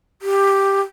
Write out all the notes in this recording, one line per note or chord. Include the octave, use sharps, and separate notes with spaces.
G4